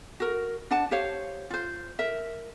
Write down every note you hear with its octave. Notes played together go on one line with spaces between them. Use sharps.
F#4 A#4
D4 F#5 A5
G4 C5 C#5 F5
F4 C5
A#4 E5